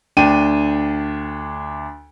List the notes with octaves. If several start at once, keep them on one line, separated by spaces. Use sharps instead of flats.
D2 D4 G5 D#7